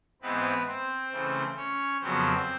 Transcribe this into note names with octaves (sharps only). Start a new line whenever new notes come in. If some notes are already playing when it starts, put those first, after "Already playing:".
G#2 E3 G#3 B3 C4 B4
C4 C5
C#3 E3 A3 C4
C#4 C#5
F2 C#3 F#3 B3 C4 C5